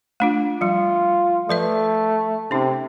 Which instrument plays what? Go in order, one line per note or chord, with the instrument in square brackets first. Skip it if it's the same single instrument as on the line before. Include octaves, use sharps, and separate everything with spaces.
[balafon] A3 D4 F4
[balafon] F3 G3 [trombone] F4
[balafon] F3 B4 E5 [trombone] A3
[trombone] C3 [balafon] C#4 D#4